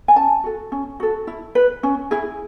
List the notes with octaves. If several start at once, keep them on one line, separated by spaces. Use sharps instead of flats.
G#5
C#4 A5
F#4 A4
C#4
F#4 A4
E4
B4
C#4
E4 G#4